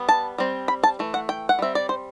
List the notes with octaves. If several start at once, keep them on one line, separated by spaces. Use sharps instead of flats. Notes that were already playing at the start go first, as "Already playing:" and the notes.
Already playing: G3 B3
A5
G3 C4
B5
A5
E3 A3
F#5
G5
F#5
G3 C4 E5
D5
C5